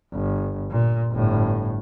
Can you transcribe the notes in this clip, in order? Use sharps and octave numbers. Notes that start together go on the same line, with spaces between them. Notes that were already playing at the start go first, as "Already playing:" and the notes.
G1
A#2
G1 A2